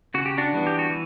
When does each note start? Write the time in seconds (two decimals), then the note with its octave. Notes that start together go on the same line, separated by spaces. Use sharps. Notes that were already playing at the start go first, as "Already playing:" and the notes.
0.14 C#3 F#4
0.26 G4
0.38 D4 F#4
0.52 E3 G3 B3
0.67 G4
0.79 F#4
0.90 E3